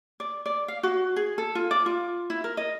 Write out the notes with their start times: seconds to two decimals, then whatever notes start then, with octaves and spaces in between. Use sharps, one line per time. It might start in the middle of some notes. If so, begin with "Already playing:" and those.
0.20 D5
0.46 D5
0.68 F5
0.83 F#4
1.16 G#4
1.38 A4
1.55 F4
1.71 D5
1.86 F4
2.30 E4
2.44 A#4
2.57 D#5